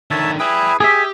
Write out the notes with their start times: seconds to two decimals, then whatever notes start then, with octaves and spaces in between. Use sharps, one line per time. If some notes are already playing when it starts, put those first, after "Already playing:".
0.11 D3 D#3 C#5 E5 A5
0.40 E4 G#4 B4 G5 B5
0.80 G4 G#4 E5 G#5